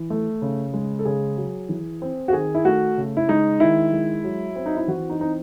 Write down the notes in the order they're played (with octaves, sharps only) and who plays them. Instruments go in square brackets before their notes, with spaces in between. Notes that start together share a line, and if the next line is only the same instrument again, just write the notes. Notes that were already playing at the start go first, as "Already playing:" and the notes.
Already playing: [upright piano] E3
A3
C#3
G#3
A4
C#3 G#4
F#3
E3
C4
F#4
D#3 G#4
E4
A3 F#4
C#3
E4
G#3 D#4
D#3 E4
G#3
F#3
C4
D#4
E4
E3 F#4
D#4
C4 D#4